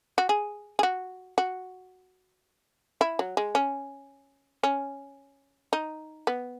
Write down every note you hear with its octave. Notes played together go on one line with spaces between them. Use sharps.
F#4
G#4
G#4
F#4
F#4
E4
F#3
G#3
C#4
C#4
D#4
B3